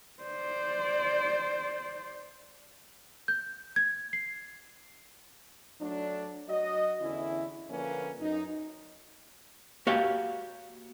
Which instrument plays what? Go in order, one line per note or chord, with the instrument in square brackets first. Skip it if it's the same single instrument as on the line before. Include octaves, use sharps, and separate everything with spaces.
[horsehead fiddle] C5 D5
[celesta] G6
G#6
C7
[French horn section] F#3 A3 D4
F#3 F#4 D#5
E2 D3 C#4 E4
D3 F3 A#3 C#4 B4
F#2 D#4
[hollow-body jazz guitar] A#3 F#4 G4 C#5 F5